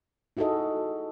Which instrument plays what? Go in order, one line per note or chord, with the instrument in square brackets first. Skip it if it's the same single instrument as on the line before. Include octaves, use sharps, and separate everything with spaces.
[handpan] D#4 E4 F#4 G#4 A4 D#5